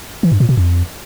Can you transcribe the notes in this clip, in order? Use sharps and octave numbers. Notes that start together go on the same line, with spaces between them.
E3
G2
A#2
B2
F2